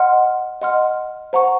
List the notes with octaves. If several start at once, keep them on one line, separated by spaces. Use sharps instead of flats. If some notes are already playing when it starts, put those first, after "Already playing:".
Already playing: D#5 F#5 C6 F6
D#5 F#5 C6 F6
C5 F#5 A#5 C#6